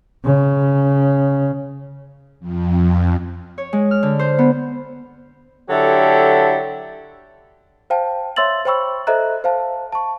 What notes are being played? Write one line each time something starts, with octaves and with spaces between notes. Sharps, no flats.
C#3
F2
C#5
G#3
F6
D3
C5
B3
D3 F#3 E4 G4 A4
C5 F5 G5 A5
C#5 E5 C6 E6 A6 F#7
C5 C#5 G5 B5 C#6 E6
A4 C5 D#5 E5 A#5 F#6
C5 F5 A5
A5 C#6